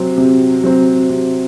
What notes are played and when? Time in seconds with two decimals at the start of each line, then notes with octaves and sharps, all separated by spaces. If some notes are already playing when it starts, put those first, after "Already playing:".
Already playing: C3 F#3 C4
0.18 C3
0.64 F#3 C4
1.10 C3